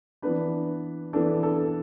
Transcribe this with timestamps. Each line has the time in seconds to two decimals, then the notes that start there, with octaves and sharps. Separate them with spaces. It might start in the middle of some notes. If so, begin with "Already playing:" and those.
0.22 E3 B3 D4 B4
1.13 E3 B3 D4 A4
1.43 A4